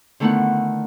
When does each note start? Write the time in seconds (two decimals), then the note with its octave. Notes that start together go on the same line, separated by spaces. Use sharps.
0.20 D3 D#3 A3 B3 E4 F#5